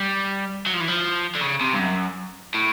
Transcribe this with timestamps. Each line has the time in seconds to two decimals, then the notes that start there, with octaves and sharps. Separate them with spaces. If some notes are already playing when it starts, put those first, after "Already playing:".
Already playing: G3
0.67 F#3
0.74 F3
0.81 E3
0.88 F3
1.35 D3
1.41 C#3
1.60 C3
1.73 G2
1.79 F#2
2.55 A2